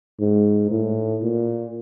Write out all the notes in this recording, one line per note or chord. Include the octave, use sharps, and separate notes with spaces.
G#2
A2
A#2